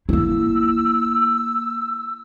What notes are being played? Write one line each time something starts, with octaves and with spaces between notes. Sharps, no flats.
A#3 E4 E6